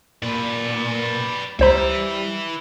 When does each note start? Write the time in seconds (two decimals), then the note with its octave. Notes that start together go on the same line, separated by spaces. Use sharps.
0.23 A#2 B4 D5
1.59 C#2 G3 B4 C5 E5 A#5